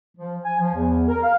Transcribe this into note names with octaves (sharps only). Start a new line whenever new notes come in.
F3
G#5
F3
E2
A#4
F5